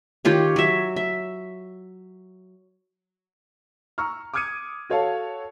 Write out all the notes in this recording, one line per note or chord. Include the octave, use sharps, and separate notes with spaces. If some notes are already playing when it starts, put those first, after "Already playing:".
D#3 F4 G4 C#5
F#3 E5
E5
A#5 C#6 E6 F6
D6 D#6 F6 G#6 C#7 D#7
F#4 A4 C#5 F5 A5